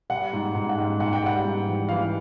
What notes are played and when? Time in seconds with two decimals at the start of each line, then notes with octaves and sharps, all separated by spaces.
0.10 G3 F#5
0.33 G#2
0.55 G#2
0.69 F#5
0.78 G#2
1.00 G#2 F#5
1.13 G5
1.23 G3 F#5
1.44 G#2
1.67 E3
1.89 E3 F5